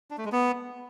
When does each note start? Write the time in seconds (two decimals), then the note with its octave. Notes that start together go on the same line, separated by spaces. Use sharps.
0.11 D4
0.18 A3
0.25 G#3
0.32 B3